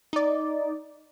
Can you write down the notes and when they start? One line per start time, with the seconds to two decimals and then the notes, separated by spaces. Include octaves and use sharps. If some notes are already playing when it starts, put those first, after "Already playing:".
0.13 D#4 D5